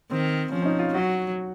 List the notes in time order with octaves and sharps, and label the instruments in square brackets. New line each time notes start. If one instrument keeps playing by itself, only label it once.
[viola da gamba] D#3 [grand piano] C4
[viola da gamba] F3 [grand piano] C#4
[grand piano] C#4
D#4
F4
[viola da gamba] F#3 [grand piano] F#4